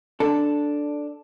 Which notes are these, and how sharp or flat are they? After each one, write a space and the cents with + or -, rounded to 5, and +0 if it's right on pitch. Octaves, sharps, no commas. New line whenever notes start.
D4 +0 A4 +0